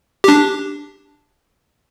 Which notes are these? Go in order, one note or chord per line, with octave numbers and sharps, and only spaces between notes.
D4 G4